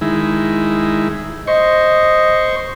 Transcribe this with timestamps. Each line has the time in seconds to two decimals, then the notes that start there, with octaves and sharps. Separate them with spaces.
0.01 D#3 G#3 E4
1.47 C5 D#5 C#6